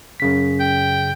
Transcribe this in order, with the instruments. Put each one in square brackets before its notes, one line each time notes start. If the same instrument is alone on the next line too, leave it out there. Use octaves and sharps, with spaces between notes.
[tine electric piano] F#2 C#3 B6
[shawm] G5